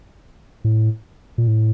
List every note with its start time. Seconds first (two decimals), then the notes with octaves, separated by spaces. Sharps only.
0.64 A2
1.38 A#2
1.48 A2